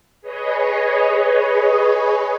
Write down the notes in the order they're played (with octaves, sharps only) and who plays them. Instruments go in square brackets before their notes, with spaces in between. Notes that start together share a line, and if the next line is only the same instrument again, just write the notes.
[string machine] G#4 B4 C#5 D#5